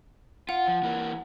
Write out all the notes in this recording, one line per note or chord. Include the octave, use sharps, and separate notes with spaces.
F4 F#5
F3
E3 A#3